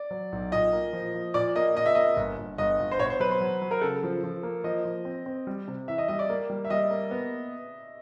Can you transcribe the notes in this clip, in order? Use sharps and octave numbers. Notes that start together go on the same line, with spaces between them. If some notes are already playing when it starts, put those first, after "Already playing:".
Already playing: D5
F#3
B1
A#2 D#5
A#3
F3
F3
A#2 D5
A#3 D#5
A#2 D#5
E5
A#3 D#5
G1
G1
G1 D#5
G1
C5
B2 C#5
C5
F#3 B4
C5
F#3
F#3
A#4
C#3 A4
F3
F3
A#3
F3 D#5
F3
C4
C4
G3
C3
E3 E5
D#5
G3 D#5
D5
A#3
G3
E5
G3 D#5
A#3
B3